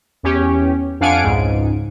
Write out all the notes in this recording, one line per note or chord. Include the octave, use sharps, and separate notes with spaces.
E2 C#4 G4
F2 D4 F5 F#5 G#5 D7
C#2 G#2